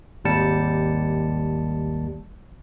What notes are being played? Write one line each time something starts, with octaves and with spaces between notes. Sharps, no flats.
G#1 D#2 G3 A5 C#7